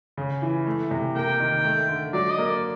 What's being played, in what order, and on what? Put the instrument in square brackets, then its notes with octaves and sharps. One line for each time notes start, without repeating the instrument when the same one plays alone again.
[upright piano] C#3
E3
A3
C3
[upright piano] A#3 [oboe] G5
[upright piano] D#3
A3
D3
[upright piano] F#3 [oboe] D5
[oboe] D#5
[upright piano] A#3
[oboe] D5